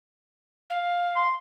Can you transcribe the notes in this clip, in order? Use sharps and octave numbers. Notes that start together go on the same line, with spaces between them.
F5
C6